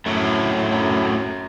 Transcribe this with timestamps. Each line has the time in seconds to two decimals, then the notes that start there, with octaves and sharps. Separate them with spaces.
0.05 F#2 A2 F#3 A3
0.73 F#2